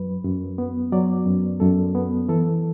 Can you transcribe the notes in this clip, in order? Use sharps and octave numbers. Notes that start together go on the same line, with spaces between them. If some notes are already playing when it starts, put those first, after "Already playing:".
Already playing: F#2 F#3 B4
F#2
B3
F#3 D5
F#2
F#2 A4
B3
E3 A4